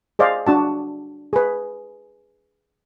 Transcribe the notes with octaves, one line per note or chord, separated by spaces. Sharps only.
G#4 C5 D5 D#5 F5
D4 F#4 A5
G#4 B4